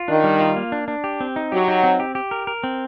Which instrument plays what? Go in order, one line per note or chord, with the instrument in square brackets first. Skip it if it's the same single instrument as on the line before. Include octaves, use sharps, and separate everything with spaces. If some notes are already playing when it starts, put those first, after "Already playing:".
Already playing: [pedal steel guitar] F4
[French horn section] D#3 [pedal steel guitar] D4
[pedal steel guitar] G3
F4
A#3
D4
D4
G4
C4
D#4
[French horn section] F#3 [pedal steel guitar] G4
[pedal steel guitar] D#4
C4
G4
G4
A#4
A#4
C4